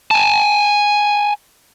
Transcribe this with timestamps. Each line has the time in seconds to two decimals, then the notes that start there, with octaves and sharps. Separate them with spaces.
0.11 G#5 A5